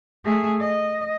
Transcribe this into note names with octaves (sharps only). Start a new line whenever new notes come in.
A3 G#4
D#5